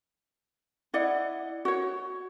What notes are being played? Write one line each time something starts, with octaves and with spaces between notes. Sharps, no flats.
E4 D5 D#5 F#5
F#4 C#5